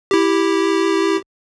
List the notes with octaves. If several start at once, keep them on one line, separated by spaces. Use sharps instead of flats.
E4 G4